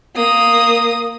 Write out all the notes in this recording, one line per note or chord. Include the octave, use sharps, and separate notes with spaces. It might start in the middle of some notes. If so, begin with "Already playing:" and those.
A#3 D#6